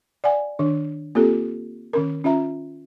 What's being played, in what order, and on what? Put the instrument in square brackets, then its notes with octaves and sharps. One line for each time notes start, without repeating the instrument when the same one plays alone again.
[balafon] D5 F#5 G#5
D#3 D4
A#3 C4 F4 G4 A4
D#3 C#4 A#4
C#4 F4 E5 A#5